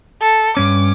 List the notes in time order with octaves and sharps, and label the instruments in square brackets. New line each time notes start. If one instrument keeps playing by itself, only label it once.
[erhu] A4
[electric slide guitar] G2 C#4 [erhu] D6